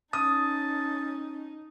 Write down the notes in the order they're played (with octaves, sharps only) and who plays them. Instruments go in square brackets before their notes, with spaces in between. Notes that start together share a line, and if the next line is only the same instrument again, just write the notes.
[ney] C#4 [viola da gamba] D#4 [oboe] A5 [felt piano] D#6